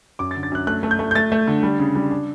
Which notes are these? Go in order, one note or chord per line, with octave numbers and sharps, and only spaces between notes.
F#2 D6
A6
D3
A6
F#2 F#6
A3 F#6
A3
G6
A3
G6
A3 A6
A3
D3
G3
C#3
G3
D4